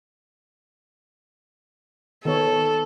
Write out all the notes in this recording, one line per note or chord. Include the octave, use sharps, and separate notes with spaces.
D#3 B3 A4 C#5